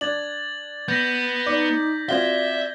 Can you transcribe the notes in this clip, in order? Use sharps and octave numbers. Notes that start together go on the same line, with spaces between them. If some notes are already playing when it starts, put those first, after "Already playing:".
D4 G#6 A6 F#7
B3 G6 A#6 B6
D#4 D5
C4 F4 F#4 D5 E5 G#6 G7